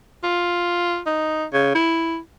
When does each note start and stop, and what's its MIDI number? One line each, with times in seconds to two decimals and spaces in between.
0.23 1.00 65
1.06 1.45 63
1.53 1.72 49
1.75 2.18 64